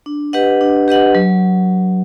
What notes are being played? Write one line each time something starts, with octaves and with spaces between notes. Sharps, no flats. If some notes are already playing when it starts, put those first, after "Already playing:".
D4
G4 B4 D#5 F#5
D4
G4 B4 D#5 F#5
F#3